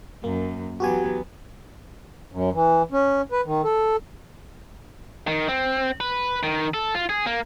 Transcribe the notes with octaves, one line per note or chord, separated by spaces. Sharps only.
F#2 A#3
E3 F#3 B3 F#4 G4 G#5
F#2
E3
C#4
B4
D#3
A4
D#3
C4
B4
D#3
A4
F4
G#4
A#3